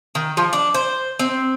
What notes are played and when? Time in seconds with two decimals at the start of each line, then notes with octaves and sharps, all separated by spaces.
0.15 D#3
0.37 F3
0.53 D4
0.74 C5
1.19 C4